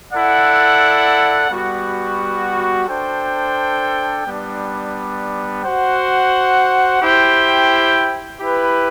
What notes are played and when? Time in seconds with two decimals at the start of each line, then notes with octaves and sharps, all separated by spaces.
0.12 E4 A4 D5 F#5
1.49 G3 B3 F#4
2.87 D4 A4 C5 G5
4.26 G3 B3 D4
5.63 F#4 C5 F#5
7.01 E4 G4 C5 G5
8.40 E4 G4 B4